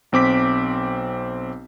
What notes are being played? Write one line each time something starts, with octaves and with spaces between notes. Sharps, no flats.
B1 C4 D6 B6